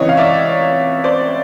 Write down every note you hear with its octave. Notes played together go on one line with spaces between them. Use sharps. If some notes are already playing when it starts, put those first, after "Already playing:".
Already playing: C#2 C3 E3 C#5 D#5
F5
D5 E5
C5 D5